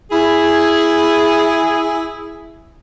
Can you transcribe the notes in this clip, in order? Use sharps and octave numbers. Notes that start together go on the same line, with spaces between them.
E4 G#4